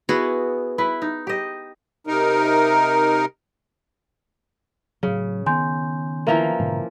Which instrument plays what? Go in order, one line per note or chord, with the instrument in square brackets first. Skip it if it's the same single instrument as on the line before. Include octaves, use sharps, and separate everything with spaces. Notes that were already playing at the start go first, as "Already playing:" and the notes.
[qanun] B3 F#4 G#4 [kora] E4
[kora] E4 B4
D#4
G4 D#5
[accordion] C3 D#4 A#4
[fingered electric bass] A2 F#3 [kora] C#3
[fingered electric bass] D#3 B3 [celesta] G#5 C6 G6
[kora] E3 F3 A#3 [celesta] E5 A#5
[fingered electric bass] G#2 B2 D3